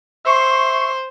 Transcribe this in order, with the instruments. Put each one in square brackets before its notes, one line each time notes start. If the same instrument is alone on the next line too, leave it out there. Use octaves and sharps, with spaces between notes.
[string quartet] C5 [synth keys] E5 C#6 C7